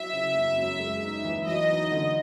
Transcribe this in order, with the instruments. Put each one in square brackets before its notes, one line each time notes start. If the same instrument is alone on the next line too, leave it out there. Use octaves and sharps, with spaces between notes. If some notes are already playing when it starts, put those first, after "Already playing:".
Already playing: [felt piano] F#3 E4 [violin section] E5
[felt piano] C#3
F#2
F#2
G#3
D#4
E3
[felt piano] F#3 [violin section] D#5
[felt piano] D#4
D3